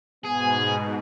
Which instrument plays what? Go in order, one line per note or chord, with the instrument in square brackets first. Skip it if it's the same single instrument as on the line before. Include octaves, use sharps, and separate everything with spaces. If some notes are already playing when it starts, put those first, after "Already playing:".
[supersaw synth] G#2 B2 [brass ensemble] B3 G#5 [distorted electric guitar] G#4